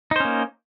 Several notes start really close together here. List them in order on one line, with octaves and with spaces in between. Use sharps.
D#4 C5 C#4 A#3